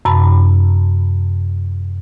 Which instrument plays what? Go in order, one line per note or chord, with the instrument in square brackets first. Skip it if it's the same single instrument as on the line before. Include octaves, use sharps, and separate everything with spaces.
[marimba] F#2 C3 A5 B5